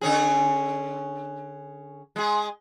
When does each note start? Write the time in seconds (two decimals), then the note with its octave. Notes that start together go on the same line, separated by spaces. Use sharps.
0.01 D3 C#4 G#4
2.16 G#3 G#4